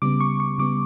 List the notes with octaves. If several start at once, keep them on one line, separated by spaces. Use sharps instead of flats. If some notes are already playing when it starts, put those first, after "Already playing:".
C#3 G3 B3 D6
C#6
C#6
C#3 G3 B3 D6